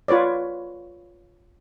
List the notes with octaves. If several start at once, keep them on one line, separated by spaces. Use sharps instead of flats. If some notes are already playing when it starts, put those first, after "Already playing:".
F4 B4 C#5 D5